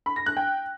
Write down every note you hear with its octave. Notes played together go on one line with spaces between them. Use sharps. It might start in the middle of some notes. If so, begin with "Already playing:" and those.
B5
A#6
F#6
G5